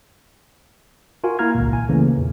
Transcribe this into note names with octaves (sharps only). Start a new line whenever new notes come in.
F4 F#4 A#4 F5 G#5
A#3 E4 F5 A#5 F6 G#6
G#1 C#2 A#2
G#5
C#3 E3 A3 A#3 C#4
E2 A#2